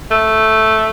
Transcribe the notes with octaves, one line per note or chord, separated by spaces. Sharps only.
A3